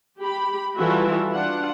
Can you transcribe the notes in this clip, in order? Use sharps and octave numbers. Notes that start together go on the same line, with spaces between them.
G4 B5
E3 G3 F4 F#4 A4 E5
D4 F4 F#5